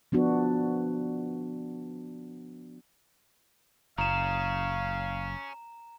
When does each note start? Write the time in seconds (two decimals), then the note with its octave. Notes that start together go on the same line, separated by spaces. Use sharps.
0.12 F3 B3 D4 F#4
3.98 F#1 C#4 G#4 F5 A#5 E7